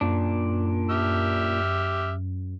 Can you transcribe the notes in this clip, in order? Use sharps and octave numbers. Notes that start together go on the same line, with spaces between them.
F#2 A#2 D4
G4 E5 F6